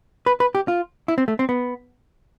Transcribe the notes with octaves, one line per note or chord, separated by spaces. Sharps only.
B4
B4
G4
F4
E4
C4
A3
C4
B3